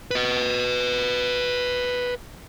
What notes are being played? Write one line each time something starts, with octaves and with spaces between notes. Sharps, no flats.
B4 D#5